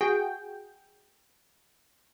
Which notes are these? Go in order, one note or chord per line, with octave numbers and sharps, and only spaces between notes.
F#4 G#4 G5